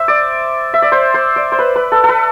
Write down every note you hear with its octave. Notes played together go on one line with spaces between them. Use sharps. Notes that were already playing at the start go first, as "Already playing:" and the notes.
Already playing: C5 E5
D5
E5
D5
C5
C5
D5
C5
B4
B4
A4
A4
B4